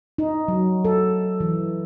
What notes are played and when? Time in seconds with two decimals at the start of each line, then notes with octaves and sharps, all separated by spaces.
0.18 D#4
0.48 F#3
0.85 A4
1.40 E3